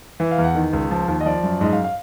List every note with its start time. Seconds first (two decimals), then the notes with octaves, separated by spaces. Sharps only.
0.20 E3
0.31 F5
0.38 E2
0.44 F#5
0.55 D#3
0.73 C#2
0.91 F3
1.08 D#2
1.20 D#5
1.25 F3 D5
1.43 F#2
1.61 G#2 D#5
1.72 F5
1.84 F5